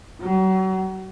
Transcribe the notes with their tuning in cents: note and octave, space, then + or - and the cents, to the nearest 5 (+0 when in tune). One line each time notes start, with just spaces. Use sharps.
F#3 +35